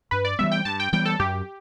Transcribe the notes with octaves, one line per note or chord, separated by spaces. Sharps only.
G2 B4
D5
E3 G3 B3 E5
G5
G2 A5
G5
E3 G3 B3 G5
A4
F#2 G4